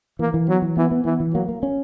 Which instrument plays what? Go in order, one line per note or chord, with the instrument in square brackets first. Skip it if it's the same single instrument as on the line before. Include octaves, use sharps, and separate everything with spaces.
[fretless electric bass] E3 [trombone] A#3
[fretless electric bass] E3
[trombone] F#3 [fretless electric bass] B3
[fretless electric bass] E3
[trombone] E3 [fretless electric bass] B3
[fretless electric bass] B3
[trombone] E3 [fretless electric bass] B3
[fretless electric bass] E3
[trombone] F#3 [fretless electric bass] A#3
[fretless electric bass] A#3
C#4